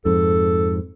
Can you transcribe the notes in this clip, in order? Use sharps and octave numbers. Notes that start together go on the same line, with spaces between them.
F2 G#2 A4